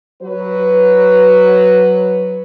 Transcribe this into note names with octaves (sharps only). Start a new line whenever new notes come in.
F#3 B4